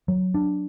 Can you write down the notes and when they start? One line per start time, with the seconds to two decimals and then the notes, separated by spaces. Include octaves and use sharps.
0.08 F#3
0.34 D4